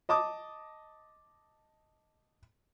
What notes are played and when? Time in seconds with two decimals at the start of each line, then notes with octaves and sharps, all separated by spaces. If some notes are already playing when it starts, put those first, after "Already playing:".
0.09 D#5 A5 D6 D#6